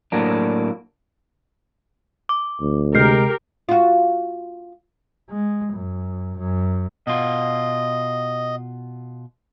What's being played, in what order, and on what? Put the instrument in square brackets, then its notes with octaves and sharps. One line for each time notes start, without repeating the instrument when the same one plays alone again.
[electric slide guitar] A2 F#3 A#3 D4
[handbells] D6
[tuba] D2
[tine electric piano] C3 G#3 [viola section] G4 A#4 [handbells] F6 G6 C7
[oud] F4 F#4
[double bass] G#3
F#2
F#2
[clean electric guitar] B2 F4 [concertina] D#5